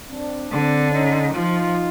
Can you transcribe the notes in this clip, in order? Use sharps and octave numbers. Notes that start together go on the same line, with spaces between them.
C4 D4
D3 C4 D4
C#4 D#4
F3 D#4 F4